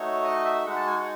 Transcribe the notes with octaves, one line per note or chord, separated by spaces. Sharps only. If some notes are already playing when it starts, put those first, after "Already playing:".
Already playing: A3 D#4 F#4 C#5
D#5
E5
G#3 D#4 F#4 F#5
A5
G#5
F#5